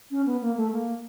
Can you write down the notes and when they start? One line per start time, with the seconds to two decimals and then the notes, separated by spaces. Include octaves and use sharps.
0.11 C#4
0.26 B3
0.41 A#3
0.57 A3
0.72 A#3